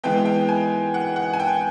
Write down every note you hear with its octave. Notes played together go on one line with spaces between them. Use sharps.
E3 G#3 B3 G5
G5
G#5
F#5
F#5
G#5
G5